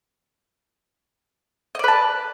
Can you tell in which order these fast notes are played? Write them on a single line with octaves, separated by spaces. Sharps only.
D#5 D5 B4 A5